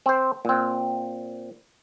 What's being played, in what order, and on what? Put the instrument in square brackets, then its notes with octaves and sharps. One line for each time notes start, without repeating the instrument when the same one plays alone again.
[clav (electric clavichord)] C4 C5
A#2 C4